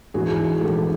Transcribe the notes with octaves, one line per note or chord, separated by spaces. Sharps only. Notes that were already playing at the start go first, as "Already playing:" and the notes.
A#1 G#2 E3 F#4 G#4
A#1 G#2 E3 G4 A4